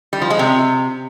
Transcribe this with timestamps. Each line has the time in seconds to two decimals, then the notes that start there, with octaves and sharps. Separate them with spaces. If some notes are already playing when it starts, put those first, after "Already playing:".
0.13 G3
0.22 F3
0.30 G#3
0.39 C3